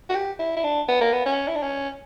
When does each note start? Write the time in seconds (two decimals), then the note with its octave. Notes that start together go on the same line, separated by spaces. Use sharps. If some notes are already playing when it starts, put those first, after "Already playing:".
0.09 F#4
0.15 G4
0.39 E4
0.56 E4
0.64 D4
0.88 B3
1.01 A#3
1.13 B3
1.26 C#4
1.48 E4
1.55 D4
1.63 C#4